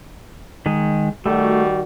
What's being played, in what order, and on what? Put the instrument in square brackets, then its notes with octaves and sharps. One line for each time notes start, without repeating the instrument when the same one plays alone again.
[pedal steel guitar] D#3 G#3
[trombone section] D#3 G3 F#4 [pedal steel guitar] A3